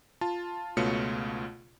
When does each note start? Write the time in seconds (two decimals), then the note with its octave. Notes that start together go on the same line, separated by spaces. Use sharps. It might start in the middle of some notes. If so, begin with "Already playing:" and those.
0.21 F4 A5
0.77 C#2 B2 A3 F4 C#5 C#7